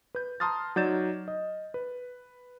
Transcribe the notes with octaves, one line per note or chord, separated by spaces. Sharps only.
B4 G6
A5 A#5 C6 D#6 F6 A6
F#3 D#4 D5 G6 A6 E7
D#5
B4